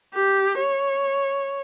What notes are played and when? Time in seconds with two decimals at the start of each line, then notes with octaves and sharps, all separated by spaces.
0.15 G4
0.58 C#5